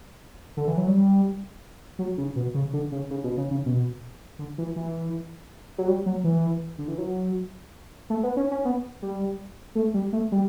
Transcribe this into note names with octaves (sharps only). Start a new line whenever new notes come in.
D3
E3
F#3
G3
F#3
C#3
B2
C#3
D3
C#3
C#3
B2
C#3
C#3
B2
D3
E3
E3
F#3
G3
F#3
E3
D3
E3
F#3
A3
B3
C#4
C#4
B3
G3
A3
G3
A3
G3